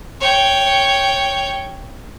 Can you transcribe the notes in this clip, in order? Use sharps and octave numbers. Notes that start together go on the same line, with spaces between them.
C#5 G5